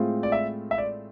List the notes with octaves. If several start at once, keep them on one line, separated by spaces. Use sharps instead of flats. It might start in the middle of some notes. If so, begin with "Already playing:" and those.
Already playing: A2 G#3 C4 F4
D5
E5
E5
D5